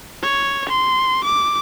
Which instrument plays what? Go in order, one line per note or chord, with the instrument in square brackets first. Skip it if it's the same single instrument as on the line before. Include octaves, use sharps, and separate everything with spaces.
[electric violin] C#5
C6
D6